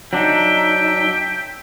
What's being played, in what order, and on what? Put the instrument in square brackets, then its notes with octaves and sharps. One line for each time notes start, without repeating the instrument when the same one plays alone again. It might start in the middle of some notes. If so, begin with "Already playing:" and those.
[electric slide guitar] F#3 D4 D#4 [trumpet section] E5 G5